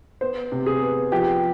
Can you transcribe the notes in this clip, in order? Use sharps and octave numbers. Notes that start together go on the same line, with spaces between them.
B3 C5
C3
G#4
B3
F3 G4